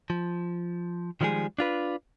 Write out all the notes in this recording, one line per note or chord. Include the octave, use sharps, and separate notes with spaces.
F3
D#3 F3 G3 G#3 G#4
D4 F4 B4